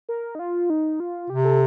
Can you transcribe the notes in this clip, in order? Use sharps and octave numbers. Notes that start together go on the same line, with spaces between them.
A#4
D#4
F4
D#4
F4
C3 G4
A4